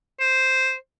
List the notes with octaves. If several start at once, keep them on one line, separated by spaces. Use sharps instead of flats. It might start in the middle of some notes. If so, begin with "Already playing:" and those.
C5